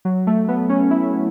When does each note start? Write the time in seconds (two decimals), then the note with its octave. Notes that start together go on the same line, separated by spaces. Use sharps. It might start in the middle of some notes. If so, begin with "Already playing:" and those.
0.05 F#3
0.27 A3
0.48 B3
0.69 C#4
0.91 E4